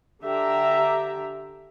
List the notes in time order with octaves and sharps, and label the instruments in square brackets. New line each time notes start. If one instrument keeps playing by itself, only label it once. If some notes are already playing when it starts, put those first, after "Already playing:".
[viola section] D3 G4 E5 A#5